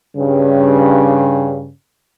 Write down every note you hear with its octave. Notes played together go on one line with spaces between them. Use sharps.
G2 C#3